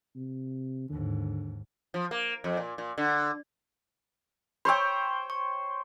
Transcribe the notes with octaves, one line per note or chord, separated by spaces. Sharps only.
C3
D#2 G#2 D3
F3
A#3
F2
A#2
A#2
D3
C5 C#5 G5 B5 C#6 E6
C#6